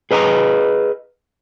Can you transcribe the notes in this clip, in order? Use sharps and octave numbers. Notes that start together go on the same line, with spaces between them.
G#4 B4 D#5 A5 A#5